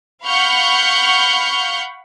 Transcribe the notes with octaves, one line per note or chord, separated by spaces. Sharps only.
F5 F#5 B5 C#6 F6 G6